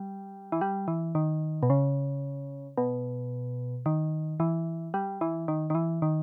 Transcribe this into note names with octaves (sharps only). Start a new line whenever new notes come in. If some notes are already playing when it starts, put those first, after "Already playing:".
Already playing: G3
E3
G3
E3
D#3
B2
C#3
B2
D#3
E3
G3
E3
D#3
D#3
E3
D#3